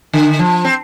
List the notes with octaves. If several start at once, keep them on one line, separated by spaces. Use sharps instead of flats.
D3
F3
C4